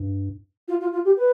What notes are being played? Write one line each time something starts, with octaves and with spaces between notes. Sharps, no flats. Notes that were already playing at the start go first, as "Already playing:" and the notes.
Already playing: G2
F4
F4
F4
G4
B4